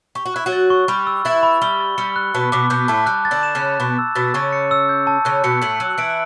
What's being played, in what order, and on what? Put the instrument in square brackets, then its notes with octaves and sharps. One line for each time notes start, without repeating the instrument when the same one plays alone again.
[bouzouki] G4 [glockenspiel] C#6
[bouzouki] F#4
[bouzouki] E4 [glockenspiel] F#6
[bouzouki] F#3 F#4
[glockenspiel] A6
C#6
[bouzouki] G3 G4 [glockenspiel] B5
[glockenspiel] E6
[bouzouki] E3 E4 [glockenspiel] A6
[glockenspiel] B5
[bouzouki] G3 [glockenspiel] G7
[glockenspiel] A6
[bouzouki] G3 [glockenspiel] C#7
[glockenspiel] F#6
[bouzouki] B2 B3 [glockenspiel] A5
[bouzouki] B2 B3 [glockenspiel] D6
[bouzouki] B2 B3 [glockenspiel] G6
[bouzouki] A2 A3 [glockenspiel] A5
[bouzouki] G3 [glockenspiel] F#6
[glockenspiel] A6
[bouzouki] D3 D4
[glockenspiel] E7
[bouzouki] C#3 C#4
[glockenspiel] F#6
[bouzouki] B2 B3 [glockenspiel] C#6
[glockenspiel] E6
[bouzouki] B2 B3 [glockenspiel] A6
[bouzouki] C#3 C#4 [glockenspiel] C#6
[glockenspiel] C#7
E6
G6
A5
[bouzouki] C#3 C#4 [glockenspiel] F#6
[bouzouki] B2 B3 [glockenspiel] C#7
[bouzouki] A2 A3 [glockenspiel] F#7
[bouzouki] F#3 [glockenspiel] F#6
[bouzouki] E3 E4 [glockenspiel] D7